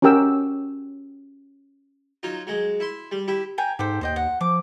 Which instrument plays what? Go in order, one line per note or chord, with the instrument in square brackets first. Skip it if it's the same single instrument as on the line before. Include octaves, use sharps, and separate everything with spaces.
[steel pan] C#4 F#4 G4 A#4 G5 E6
[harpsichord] F#3 D#4 F4
F#3 G#3
E4 C6
G3
E4 G4
[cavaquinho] G5 G#5 A#5
[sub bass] G#2 [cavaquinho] G4 A4 C5
[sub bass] D#2 [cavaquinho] C5 D#5 G5
[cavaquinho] F#5
[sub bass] F3 [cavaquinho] D6